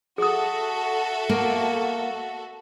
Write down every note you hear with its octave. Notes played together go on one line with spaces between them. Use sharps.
F#4 G#4 A4 E5 D#6
A#3